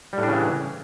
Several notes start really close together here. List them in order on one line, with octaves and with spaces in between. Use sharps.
G3 A2 D4 C#3 E3